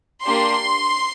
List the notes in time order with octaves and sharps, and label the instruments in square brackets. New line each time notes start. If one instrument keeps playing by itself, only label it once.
[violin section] A#3 D4 G4 C6